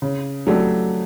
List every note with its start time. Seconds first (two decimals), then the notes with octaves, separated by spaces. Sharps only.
0.02 C#3
0.47 F#3 A3 D4 G4